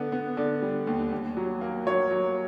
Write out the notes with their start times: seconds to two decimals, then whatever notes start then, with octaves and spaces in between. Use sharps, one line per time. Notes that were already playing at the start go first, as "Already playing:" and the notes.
Already playing: D3 B3
0.12 B3
0.37 D3
0.62 G3
0.87 D#2
1.12 D#2
1.37 F#3
1.61 A#3
1.87 F#3 C#5
2.11 F#3